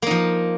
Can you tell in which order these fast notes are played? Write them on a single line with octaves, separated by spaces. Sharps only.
A#3 D#4 F3